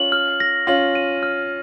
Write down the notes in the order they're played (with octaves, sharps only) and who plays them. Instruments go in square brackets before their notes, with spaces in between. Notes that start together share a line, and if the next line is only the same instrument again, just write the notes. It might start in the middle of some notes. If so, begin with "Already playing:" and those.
Already playing: [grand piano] C#4 F4 [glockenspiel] F#7
[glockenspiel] F6
A#6
[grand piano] C#4 F4 [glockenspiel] F#7
[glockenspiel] D#7
F6